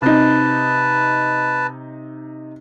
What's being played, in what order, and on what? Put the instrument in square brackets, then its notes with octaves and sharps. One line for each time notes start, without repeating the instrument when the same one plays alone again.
[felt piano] C3 D#4 [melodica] B4 A5